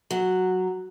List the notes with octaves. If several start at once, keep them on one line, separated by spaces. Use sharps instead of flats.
F#3